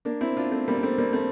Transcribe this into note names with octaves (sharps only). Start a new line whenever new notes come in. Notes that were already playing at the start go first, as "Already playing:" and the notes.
A#3 D4
C4 E4
D4 F4
A3 C4
G3 A#3
D4
A3 C4
G3 A#3
A3 C4